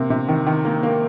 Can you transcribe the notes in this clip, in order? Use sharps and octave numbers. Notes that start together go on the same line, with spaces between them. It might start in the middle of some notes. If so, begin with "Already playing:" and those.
Already playing: C3 A#3
C3
D#3
D#3
A#3
A#3